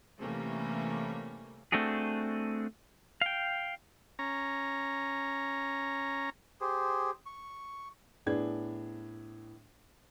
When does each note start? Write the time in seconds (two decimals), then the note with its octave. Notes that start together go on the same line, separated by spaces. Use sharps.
0.20 C3 E3 G3 A3 A#3 C#4
1.72 A3 C4 D4 F#4 G#4
3.21 F5 G5
4.19 C#4 A#5
6.61 G4 G#4 C5
7.26 C#6
8.26 A2 B3 D4 G#4 G#6